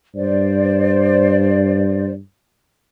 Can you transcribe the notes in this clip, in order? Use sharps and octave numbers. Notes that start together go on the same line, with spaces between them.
G2 C5 D5